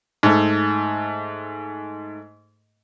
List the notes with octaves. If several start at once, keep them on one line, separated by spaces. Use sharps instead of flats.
G#2 A3